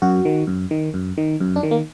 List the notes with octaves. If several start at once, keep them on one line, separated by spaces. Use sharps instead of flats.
F#2 F#4
D#3
F#2
D#3
F#2
D#3
F#2
D4
D#3
A#3